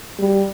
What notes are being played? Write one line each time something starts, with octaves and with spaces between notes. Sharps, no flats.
G3